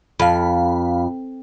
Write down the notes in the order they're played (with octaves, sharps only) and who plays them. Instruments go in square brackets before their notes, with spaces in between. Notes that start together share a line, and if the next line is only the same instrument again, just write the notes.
[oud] F2 [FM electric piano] F5 B5